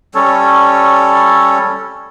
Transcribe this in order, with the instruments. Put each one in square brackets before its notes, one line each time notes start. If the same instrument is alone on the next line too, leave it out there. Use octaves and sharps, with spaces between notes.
[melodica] G3 C#4 A4 C#5